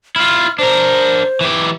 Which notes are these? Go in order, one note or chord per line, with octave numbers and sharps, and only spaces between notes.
E4 F4 F6
D4 A#4 C5
E3 G4